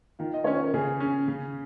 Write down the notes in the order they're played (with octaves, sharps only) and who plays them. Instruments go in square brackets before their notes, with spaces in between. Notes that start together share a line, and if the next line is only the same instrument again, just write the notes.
[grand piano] D#3 [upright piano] F4
[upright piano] D#5
[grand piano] C#4 [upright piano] C#5
[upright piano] C5
A#4
[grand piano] C#3 [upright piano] G#4
[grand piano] C#4
C#3